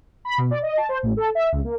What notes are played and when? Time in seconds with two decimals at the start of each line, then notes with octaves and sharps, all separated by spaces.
0.25 B5
0.38 B2
0.51 D5
0.63 D#5
0.77 A5
0.89 C5
1.03 A1
1.17 A4
1.35 E5
1.52 C#2
1.64 A#3